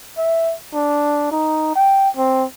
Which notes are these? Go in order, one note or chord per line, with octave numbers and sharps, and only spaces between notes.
E5
D4
D#4
G5
C4